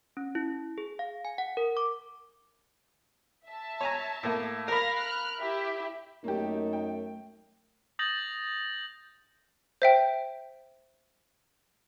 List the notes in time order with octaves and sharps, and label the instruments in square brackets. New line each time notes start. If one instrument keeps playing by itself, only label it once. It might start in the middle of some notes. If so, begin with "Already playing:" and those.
[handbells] C#4
E4
G#4
F5
G#5
F#5
A#4
D6
[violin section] E5 A5
[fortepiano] C#5 G#5 A#5
A2 A#3
[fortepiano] A#4 B5 [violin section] F5 F6 A#6
[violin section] F6 F#6
E4 G4 E5
[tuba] F#2 [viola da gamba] A3 [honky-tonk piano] A#3 G4 [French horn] D#4
[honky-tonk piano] G5
[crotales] D#6 G6 A6 A#6 F#7
[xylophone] C5 E5 G5